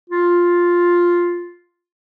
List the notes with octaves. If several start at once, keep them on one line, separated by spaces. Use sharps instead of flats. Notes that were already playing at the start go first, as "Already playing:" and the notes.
F4